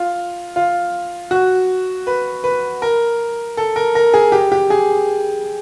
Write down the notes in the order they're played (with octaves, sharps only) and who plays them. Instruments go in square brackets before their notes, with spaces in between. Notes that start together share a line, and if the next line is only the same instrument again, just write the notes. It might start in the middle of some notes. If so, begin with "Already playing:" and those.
Already playing: [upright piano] F4
F4
F#4
B4
B4
A#4
A4
A#4
A#4
G#4
G4
G4
G#4